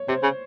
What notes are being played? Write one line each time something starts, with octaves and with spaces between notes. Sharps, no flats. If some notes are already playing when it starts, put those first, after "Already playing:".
Already playing: C#5
C3 C5
C#3